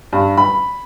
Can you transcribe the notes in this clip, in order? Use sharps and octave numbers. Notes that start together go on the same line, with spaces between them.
G2
B5